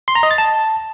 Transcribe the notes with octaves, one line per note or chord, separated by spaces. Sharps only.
C6
A#5
D#5
A6
A5